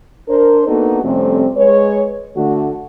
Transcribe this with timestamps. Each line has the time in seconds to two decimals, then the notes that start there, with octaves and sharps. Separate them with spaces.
0.28 D4 A#4 C5
0.67 A#3 B3 D4 D#4 F#4 A4
1.04 F2 C3 G3 A3 C4 C#4
1.55 G#3 B4 C#5
2.36 D3 A3 F#4